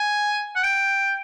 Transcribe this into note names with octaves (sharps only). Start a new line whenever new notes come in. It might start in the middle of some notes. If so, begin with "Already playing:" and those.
Already playing: G#5
F#5
G5